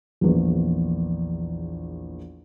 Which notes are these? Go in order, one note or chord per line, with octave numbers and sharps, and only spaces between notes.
A#1 E2